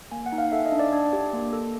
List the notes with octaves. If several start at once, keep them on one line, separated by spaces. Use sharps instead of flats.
A#3 G#5
F#5
D#4
F5
A4 E5
D#5
D4
D5
D4
G4
A#3
A4